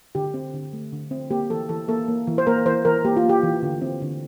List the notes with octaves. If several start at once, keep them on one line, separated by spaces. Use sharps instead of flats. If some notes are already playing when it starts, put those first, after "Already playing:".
D3 G4
C4
D3
A3
D3
C4
A#3 G4
E3 A4
E3 A4
A#3 A4
A#3
E3
C5
A#3 A#4
E3 C5
E3 A#4
A#3 G4
F4
A#3
G4
E3
D3
C4
D3